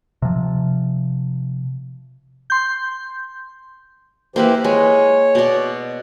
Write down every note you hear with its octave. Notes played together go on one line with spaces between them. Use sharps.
C3 F3
C6 G6
E3 A#3 E4 G4 B4 C5
G#3 C#5
B2 D5